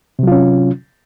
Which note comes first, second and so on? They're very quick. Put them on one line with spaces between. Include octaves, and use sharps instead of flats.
C3 F#3 F4 C#4